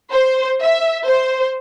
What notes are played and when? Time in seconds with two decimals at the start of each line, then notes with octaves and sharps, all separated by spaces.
0.12 C5
0.61 E5
1.08 C5